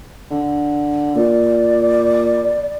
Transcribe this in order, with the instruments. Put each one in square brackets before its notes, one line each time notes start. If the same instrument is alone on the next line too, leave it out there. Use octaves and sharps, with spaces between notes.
[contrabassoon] D3
[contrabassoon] A#2 [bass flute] D5